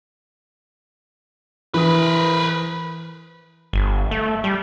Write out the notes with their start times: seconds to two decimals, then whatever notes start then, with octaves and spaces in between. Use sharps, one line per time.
1.74 E3 A#4 B4 D#6
3.73 G1
4.11 A3
4.44 G3